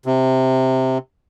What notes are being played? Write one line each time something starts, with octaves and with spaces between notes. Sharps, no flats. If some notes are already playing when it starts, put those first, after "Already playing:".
C3